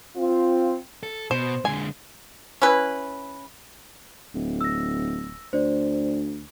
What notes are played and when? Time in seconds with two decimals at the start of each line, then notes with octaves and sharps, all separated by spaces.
0.15 C4 F4
1.03 A4
1.31 B2 C5
1.65 D3 G#3 G#5
2.62 C#4 E4 B4
4.34 D1
4.61 E6 A#6
5.53 D2 C5 D5